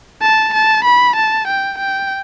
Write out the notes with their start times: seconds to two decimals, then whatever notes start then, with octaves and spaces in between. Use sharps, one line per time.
0.22 A5
0.53 A5
0.85 B5
1.16 A5
1.48 G5
1.78 G5